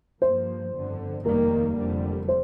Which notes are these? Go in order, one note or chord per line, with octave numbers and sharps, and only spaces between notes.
G2 F3 A#3 C5
G1 F2 D3
F1 D#2 D#3 G3 A#3 A#4
F1 F2 D3 G3
C5